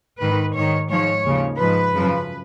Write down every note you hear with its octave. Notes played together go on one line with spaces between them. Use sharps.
G#2 D#3 B4
G#2 D#3 C#5
G#2 F3 C#5
D#2 C#3 F3
G#2 F3 B4
F#2 C#3 F3